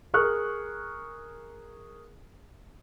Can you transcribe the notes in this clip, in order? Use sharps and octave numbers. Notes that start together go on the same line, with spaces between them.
G#4 A#4 C#6 F6 F#6